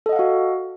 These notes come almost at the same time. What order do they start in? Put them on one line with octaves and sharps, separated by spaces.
A4 D#5 F#5 F5 F#4